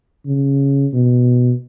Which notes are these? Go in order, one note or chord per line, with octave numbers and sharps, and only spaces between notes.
C#3
B2